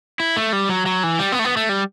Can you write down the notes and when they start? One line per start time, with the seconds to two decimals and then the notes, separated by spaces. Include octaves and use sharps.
0.20 E4
0.37 A3
0.53 G3
0.69 F#3
0.86 F#3
1.03 E3
1.19 G3
1.32 B3
1.39 A3
1.45 B3
1.57 A3
1.69 G3